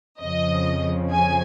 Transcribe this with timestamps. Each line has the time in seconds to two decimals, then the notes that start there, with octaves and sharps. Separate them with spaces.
0.21 F2 C#3 F3 D#5
1.11 G#5